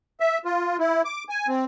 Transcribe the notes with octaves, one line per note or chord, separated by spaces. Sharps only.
E5
F4
E4
D6
G#5
C4